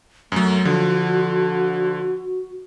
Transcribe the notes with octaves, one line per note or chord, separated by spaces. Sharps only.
F#2 F#3 A3
D3 F3 F#4